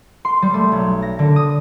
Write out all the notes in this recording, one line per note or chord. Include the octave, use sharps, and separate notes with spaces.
C6
G3
A3
B1
A#6
D3
D#6